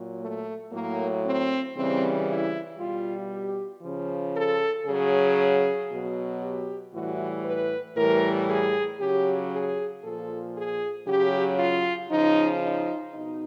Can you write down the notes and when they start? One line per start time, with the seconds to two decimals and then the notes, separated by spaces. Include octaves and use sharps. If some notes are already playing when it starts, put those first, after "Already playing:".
Already playing: A#2 F#3
0.19 A3
0.71 A2 F#3 A#3
1.24 C4
1.75 C#3 E3 G3 C4
2.27 E4
2.78 B2 G3 F4
3.31 G4
3.82 C#3 F3
4.34 A4
4.85 C#3 F#3 G#4
5.89 B2 F#3
6.41 G4
6.92 A2 E3 G3 F#4
7.44 B4
7.96 A2 E3 G3 A#4
8.48 G#4
9.00 C#3 F#3 G4
9.51 G#4
10.03 A#2 F3 A4
10.55 G#4
11.06 C#3 F#3 G4
11.58 F4
12.10 C#3 F3 D#4
12.62 D#4
13.13 B2 D#4